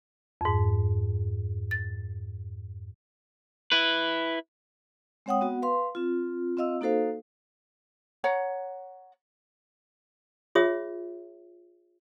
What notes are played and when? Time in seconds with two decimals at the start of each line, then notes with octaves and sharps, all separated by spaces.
0.41 F2 G#2
1.71 A6
3.72 E4 B4
5.26 G#3 C4 C#5 F#5 G5 D#6
5.41 B3 F#4 F#5
5.62 B4 F5 C6
5.95 C4 F4
6.57 C4 F4 D#5 F5 E6
6.81 A#3 D#4 F#4 A4 C5 F5
8.24 C#5 F#5 A#5
10.55 F4 G#4 C#5 E5 D#6